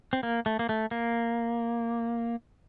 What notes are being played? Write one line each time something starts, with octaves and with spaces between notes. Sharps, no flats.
C4
A#3
A3
A#3
A3
A#3